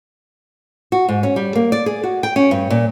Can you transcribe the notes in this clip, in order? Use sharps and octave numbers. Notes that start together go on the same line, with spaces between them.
F#4
G#2
C#4
G3
A#3
D5
G#4
F#4
G5
C#4
G2
A#2